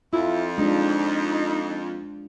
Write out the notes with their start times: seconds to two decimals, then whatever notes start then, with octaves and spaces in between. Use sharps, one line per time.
0.13 F2 E4 F4
0.58 G#3 D4 D#4